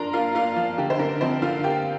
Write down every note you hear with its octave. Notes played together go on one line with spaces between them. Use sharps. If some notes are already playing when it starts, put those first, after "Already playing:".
Already playing: F3 D4 A#4 A#5 C6
A#3 F4 F5
A#3 F4 F5
F3
D3 G4
C5
D3 A#4
F3 C4 C5
D3 F4 F5
A#3 G4 G5